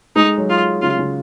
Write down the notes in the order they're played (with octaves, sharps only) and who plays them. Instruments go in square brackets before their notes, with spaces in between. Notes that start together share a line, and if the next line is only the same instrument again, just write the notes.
[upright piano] G#3 [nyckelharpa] D#4
[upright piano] F#3
[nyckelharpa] F4
[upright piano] C#3 [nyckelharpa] F4
[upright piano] C#3